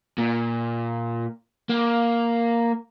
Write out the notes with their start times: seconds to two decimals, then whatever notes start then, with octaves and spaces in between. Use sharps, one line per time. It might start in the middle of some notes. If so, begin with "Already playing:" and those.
0.18 A#2
1.69 A#3